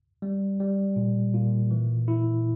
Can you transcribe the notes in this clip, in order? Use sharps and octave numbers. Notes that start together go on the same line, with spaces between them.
G3
G3
A#2
A#2
E3
E4